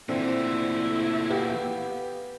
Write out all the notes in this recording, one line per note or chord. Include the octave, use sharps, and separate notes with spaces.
A#2 D3 E3 A3 C4 E4
B3 G4 F5